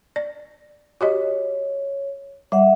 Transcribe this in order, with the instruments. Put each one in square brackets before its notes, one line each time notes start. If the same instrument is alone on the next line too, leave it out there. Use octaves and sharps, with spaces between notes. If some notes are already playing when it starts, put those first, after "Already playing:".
[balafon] D5
[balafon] F#4 G4 D#5 [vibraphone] C#5
[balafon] G3 [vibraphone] E5 F#5